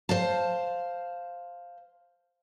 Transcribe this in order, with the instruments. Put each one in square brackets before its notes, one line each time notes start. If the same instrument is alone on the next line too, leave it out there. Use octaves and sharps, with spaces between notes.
[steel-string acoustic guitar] C5 F5 A5